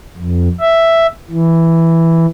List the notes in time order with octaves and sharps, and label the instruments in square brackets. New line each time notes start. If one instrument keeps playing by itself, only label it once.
[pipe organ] F2
E5
E3